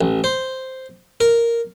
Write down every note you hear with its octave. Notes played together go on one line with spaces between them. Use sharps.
A1
C5
A#4